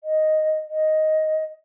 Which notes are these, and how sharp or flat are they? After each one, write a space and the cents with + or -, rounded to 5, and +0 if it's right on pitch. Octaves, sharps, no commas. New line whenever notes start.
D#5 +0
D#5 +5